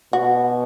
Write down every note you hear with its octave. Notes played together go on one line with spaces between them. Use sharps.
B2 F#4